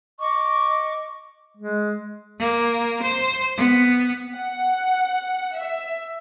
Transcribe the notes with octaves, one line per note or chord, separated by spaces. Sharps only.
D#5 C#6 D6
G#3
A#3
C5
B3
F#5
E5